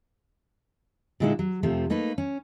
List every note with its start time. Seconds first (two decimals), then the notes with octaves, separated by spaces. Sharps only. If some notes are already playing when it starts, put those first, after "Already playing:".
1.20 A#2 D3 G#3 D#4 E4 F#5
1.39 F#3
1.63 F2 C3 F3 A3
1.90 A3 A#3 D#4 B4
2.18 C#4